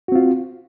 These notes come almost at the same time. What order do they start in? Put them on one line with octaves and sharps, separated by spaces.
F#4 C4 F4